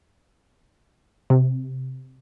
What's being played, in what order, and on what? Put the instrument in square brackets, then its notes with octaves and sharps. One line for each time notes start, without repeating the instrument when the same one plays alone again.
[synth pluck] C3